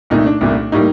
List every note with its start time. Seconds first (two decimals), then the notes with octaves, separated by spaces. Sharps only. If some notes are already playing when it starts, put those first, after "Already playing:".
0.10 C2 A#2 A3 D#4
0.26 D4
0.41 C2 A#2 A3
0.72 A2 G3 A#3 D#4